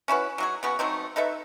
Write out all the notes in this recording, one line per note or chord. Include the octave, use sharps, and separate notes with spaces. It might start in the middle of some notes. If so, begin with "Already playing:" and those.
C#4 E4 F#4 B4
F#3 F#4 G#4
C#3 B3 F#4
F#3 A3 C4 D#4
D#4 A4 B4 E5